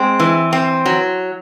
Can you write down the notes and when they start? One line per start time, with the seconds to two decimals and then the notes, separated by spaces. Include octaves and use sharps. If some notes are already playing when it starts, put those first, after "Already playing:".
Already playing: G#3 C4
0.20 E3
0.53 C4
0.86 F#3